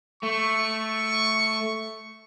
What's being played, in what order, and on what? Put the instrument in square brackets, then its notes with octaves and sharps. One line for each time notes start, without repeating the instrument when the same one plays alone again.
[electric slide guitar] A3 [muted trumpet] C#6